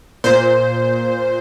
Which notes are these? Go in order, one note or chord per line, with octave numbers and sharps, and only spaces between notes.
A#2 C5